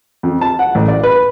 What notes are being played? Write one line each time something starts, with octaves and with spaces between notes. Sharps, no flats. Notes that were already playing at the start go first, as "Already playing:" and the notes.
F2
A5
F#5
A1
D5
B4